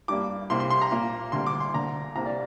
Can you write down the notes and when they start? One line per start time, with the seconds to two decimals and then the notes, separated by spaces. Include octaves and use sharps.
0.08 G2 G3 A#3 D6
0.50 C2 C3 A#3 C6
0.60 C6
0.70 C6
0.82 A#5
0.91 A#2 A#3
1.32 D2 D3 G3 A#3 C6
1.46 D6
1.60 C6
1.74 D2 D3 A#3 A#5
2.15 C2 C3 A#3 A#5
2.26 D5